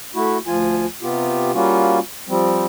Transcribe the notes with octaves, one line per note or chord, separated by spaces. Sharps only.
A3 E4 F#4
D2 F3 F4 G#5
C3 B3 F4 G4
G3 A#3 C#4 F4 F#4
F3 G3 C4